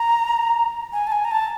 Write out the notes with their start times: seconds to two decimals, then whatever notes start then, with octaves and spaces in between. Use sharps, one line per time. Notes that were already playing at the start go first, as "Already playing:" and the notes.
Already playing: A#5
0.93 G#5
1.07 A5
1.12 G#5
1.25 A#5
1.31 A5